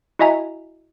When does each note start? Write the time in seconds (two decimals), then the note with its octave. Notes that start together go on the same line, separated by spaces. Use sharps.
0.19 E4 F#4 D#5 E5 G#5 A#5